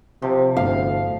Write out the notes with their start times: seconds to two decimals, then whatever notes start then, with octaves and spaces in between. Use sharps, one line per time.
0.22 C3 F3
0.57 G1 D2 A2 F5